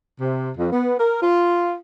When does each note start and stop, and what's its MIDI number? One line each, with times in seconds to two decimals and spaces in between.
0.21 0.51 48
0.57 0.70 41
0.72 0.96 59
0.98 1.19 70
1.22 1.75 65